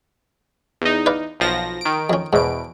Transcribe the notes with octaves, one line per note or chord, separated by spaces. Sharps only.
E2 D#4
B4 D5 F5
B1 F3 A#6
D#3 D7
F2 C#4
E2 G#2 B2 D7